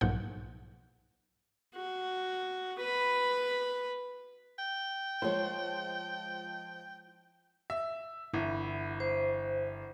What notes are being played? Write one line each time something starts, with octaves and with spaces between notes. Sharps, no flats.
B1 G#2 F3 A#3 F#5 G6
F#4
B4 B5
G5
F3 G#3 F4 C5 C#5
E5
G1 E4
C5